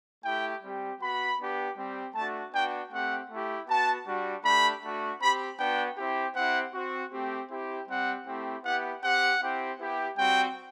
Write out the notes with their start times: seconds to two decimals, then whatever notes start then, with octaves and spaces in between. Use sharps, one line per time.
0.24 A3 E4 G4 G5
0.62 G3 C4 G4
1.01 B3 F#4 B5
1.39 B3 D4 G4
1.77 G3 C4 G4
2.15 A3 D4 F#4 A5
2.53 B3 D4 F#4 G5
2.91 A3 C4 G4 F#5
3.30 A3 E4 G4
3.68 B3 F#4 A5
4.06 G3 D4 F#4
4.44 A3 D4 G4 B5
4.83 A3 D4 F#4
5.21 C4 G4 B5
5.59 B3 D4 F#4 G5
5.98 C4 E4 G4
6.36 C4 E4 G4 F#5
6.73 C4 F#4
7.12 A3 C4 G4
7.50 C4 E4 G4
7.88 G3 C4 G4 F#5
8.27 A3 C4 E4 G4
8.64 B3 E4 G4 F#5
9.03 C4 G4 F#5
9.41 C4 E4 G4
9.79 B3 E4 G4
10.17 G3 C4 F#4 G5